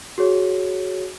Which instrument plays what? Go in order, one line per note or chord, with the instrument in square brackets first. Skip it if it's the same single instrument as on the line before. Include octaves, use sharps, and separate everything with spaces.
[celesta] F#4 G#4 C#5